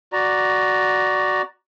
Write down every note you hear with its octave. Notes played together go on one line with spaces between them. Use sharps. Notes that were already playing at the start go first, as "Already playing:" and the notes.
F#4 D5 A#5